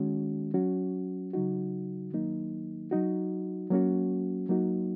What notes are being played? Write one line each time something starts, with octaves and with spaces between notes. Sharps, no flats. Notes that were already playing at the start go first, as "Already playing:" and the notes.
Already playing: D#3 G#3 C#4 F#4
F#3 C#4 F#4
C#3 F#3 D#4 F#4
D#3 F#3 A#3 D#4
F#3 D#4 F#4
F#3 A#3 C#4 F#4
F#3 A#3 D#4 F#4